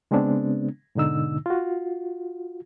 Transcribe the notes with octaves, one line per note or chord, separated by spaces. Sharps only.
C#3 G#3 B3 C4 D4
G#2 B2 D3 D#4 E6
F4 F#4